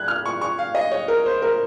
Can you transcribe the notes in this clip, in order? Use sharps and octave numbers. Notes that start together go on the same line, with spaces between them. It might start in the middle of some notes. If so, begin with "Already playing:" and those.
Already playing: F#6 G#6
F6
C#6
C#6
F5
D#5
C#5
A#4
C5
A#4